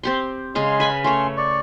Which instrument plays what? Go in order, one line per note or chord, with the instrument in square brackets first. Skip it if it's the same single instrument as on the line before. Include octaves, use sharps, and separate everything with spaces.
[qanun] C4 G4 C6
[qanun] C#3 G#4 F5 [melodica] G#3 C6
[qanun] B4 G#5 B5
[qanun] A3 C#5 [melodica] C#4 C6
[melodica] D5 C#6